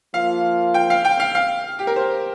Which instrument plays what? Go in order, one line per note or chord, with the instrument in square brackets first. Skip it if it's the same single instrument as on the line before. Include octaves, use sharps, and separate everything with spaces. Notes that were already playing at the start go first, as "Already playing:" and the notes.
[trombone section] F3 A#3 F4 [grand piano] F5
[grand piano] G5
F5
G5
F5
F5
G4
A#4
C5